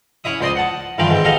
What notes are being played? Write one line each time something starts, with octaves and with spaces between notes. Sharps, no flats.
C#4 E4 E5 D#6
C#2 C5 D5 D#5 C6 D#6
F#5 A5
G2 D#3 E3 D4 F4 G5
G#2 C4 G5
B3 G4 A4 D#5 F5 G5